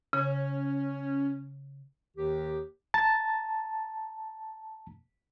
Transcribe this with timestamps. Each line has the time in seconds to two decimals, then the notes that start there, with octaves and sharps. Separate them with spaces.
0.13 C#3 C#4
2.16 D#2 D#3 G4
2.94 A5 A#5 A6